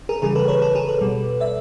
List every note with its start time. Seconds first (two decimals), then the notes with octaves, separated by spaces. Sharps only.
0.09 G#4 A#4
0.22 C#3 E3 G3 G#4 A#4
0.35 A4 B4
0.48 B4 C#5
0.62 A4 B4
0.75 G#4 A#4
0.88 A4 B4
1.01 B2 G3
1.40 D5 E5